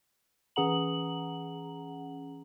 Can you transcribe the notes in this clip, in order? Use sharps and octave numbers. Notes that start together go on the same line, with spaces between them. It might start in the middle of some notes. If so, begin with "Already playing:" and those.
E3 C#4 G#4 F#5 A#5 F#7